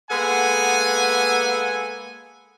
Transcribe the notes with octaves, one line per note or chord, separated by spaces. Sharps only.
G#3 A#3 B3 A4 F#5 G#5